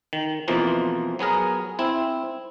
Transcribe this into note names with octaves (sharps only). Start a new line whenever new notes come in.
D#3
F2 B2 E3 F3 A#3
F#3 B3 G#4 A#4
C4 E4